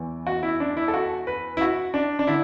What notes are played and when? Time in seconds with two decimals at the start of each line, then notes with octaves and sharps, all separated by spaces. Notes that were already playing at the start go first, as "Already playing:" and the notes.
Already playing: E2 E3
0.27 F#4
0.43 E4
0.60 D4
0.77 E4
0.88 A4
0.94 F#4
1.27 B4
1.57 E4
1.61 F#4
1.94 D4
2.19 D4
2.27 D3 E4